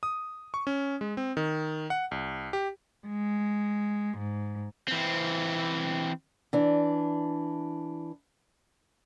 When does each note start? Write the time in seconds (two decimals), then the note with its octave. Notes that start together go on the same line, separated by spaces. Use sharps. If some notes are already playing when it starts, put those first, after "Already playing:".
0.03 D#6
0.54 C#6
0.67 C#4
1.01 G#3
1.17 C4
1.37 D#3
1.90 F#5
2.11 C2
2.53 G4
3.07 G#3
4.18 G#2
4.88 E3 C4
6.53 E3 D4